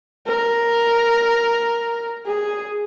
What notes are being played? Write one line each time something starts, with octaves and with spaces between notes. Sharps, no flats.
A#4
G#4